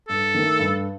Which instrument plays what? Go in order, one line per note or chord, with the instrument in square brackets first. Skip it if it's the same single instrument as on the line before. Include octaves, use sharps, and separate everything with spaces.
[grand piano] G2 [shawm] A4
[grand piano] D#3 A3
G2